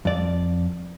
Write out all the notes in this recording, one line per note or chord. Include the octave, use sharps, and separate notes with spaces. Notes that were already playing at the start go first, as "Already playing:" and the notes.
F2 D5